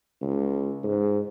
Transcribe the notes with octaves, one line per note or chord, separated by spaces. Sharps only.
C#2
G#2